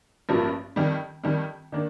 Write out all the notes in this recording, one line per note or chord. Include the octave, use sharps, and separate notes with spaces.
A1 G2 F3 A#3
F2 D#3 G3
F2 D#3 G3
D#3 A#3 D4